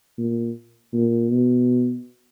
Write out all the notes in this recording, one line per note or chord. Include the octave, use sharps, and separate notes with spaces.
A#2
A#2
B2